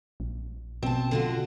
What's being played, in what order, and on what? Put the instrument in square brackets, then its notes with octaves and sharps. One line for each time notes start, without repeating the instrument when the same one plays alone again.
[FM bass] A#1
[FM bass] B2 [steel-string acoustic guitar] C4 A5
[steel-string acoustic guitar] D3 F4 F#4